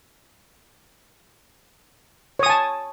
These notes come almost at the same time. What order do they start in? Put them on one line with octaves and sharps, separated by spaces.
C#5 D#6 G#5 A5